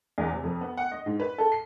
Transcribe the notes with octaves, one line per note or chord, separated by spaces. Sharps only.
E2
C3
F2
B3
F#5
D#5
G#2
B4
A4
C7